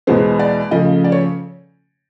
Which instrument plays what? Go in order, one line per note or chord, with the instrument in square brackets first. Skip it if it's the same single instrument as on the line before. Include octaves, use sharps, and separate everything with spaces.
[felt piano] E2 B2 G#3 B3 C5
D5
C#3 F3 A3 D#5
D5
C#5